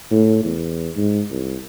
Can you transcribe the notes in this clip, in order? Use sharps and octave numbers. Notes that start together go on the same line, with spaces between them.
A2
E2
G#2
C2